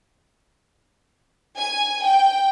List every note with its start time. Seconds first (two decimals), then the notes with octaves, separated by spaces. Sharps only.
1.58 G#5
2.04 G5